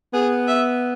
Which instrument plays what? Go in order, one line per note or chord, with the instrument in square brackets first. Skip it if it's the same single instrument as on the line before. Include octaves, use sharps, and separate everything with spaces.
[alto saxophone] B3 [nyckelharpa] G#4
[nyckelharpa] E5